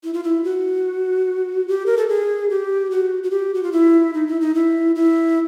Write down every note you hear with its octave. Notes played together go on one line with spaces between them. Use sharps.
E4
F4
E4
F#4
G4
A#4
A4
G#4
G4
F#4
F#4
G4
F#4
F4
E4
D#4
E4
D#4
E4
E4